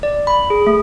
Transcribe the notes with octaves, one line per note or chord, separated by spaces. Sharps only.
D5
B5
G#4
A3